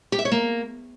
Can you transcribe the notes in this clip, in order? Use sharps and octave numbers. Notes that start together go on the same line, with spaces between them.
G4
E5
C#5
A#3